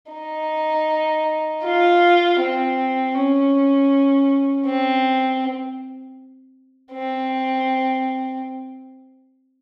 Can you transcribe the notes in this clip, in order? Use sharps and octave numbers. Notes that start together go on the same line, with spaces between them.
D#4
F4
C4
C#4
C4
C4